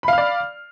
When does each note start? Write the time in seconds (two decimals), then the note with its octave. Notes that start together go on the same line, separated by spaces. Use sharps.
0.03 B5
0.08 F5
0.13 F6
0.18 D5